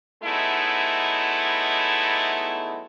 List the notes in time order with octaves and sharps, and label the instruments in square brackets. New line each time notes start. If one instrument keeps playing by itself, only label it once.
[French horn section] F#3 G#3 A3 B3 D#4 E4